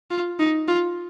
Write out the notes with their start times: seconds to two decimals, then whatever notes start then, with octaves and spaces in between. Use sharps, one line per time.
0.11 F4
0.39 D#4
0.68 F4